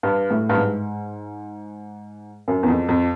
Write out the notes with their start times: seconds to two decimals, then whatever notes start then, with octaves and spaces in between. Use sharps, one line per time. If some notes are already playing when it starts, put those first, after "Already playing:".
0.03 G2
0.31 A2
0.49 G2
0.58 G#2
2.48 F#2
2.63 E2
2.68 F2
2.89 F2